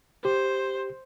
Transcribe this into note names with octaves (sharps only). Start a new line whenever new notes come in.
G4 C5